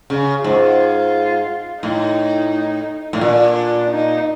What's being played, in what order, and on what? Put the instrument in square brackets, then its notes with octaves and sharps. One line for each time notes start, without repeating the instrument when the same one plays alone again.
[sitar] C#3
[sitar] G#2 [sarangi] F4
[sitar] A2 [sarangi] D#4
[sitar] A2
[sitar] A#2 [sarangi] D4
[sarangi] D#4